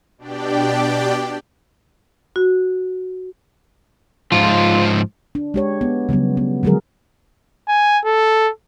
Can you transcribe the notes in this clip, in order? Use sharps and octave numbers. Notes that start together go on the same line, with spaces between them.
B2 D4 G4 D5 G5
F#4
G#2 F3 F4
D4
G#3 G4 C#5
B3
C#3 F#3 G3 B3
B3
D3 F3 F#3 G#3 G#4 A#4
G#5
A4